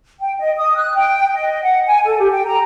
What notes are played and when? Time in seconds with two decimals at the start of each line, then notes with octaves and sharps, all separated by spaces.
0.21 G5
0.39 D#5
0.56 D#6
0.77 F#6
0.95 G5
1.34 D#5
1.62 F#5
1.87 G#5
2.06 A4
2.19 G4
2.32 G5
2.46 A#5